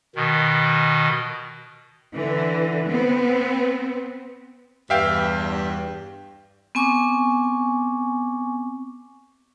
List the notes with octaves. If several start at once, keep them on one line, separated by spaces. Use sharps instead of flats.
B2 D#3
D3 E3
B3 C4
E2 G2 E5 F5 G5
B3 C4 G#5 C#6 D6